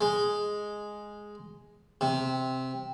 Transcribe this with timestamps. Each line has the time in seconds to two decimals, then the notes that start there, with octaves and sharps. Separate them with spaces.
0.01 G#3
2.01 C3